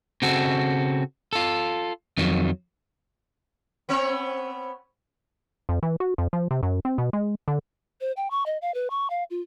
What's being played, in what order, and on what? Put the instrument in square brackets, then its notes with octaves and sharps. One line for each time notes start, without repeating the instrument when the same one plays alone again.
[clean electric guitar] C#3 C4 F#4 A4
F4 A4
F2 D#3 F#3
[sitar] B3 C4 C#5
[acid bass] F2
E3
F#4
F2
F3
C3
F#2
C4
B2
G#3
D3
[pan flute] C5
G5
C#6
D#5
F5
B4
C#6
F5
F4